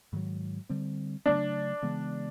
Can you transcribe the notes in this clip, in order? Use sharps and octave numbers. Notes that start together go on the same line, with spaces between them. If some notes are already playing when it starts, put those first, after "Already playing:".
G#2 D#3 F#3
D3 G3 C4
C#3 F#3 A3 D4
C#3 E3 G#3 B3